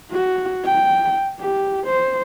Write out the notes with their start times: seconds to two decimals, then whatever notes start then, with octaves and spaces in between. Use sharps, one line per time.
0.12 F#4
0.64 G5
1.41 G4
1.87 C5